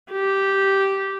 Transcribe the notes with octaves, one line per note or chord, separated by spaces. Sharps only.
G4